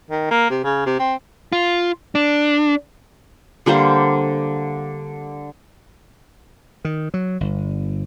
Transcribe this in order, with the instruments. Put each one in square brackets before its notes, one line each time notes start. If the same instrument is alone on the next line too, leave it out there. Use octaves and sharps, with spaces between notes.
[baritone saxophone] D#3
A#3
C3
C#3
C3
C4
[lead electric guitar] F4
D4
[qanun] D3 G3 A#3 C5
[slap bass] D#3
F#3
G1